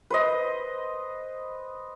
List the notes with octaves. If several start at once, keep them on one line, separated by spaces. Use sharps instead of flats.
B4 C5 D#5